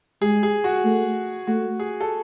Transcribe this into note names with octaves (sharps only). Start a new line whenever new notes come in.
G#3 G#4
G#4
F#4
A3
A3 F#4
G#4
A4